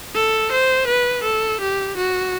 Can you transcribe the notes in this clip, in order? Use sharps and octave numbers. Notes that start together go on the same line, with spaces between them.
A4
C5
B4
A4
G4
F#4